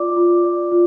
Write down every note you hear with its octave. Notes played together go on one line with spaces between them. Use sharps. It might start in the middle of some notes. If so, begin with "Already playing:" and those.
Already playing: F4 D5 D6
F4
D5
F4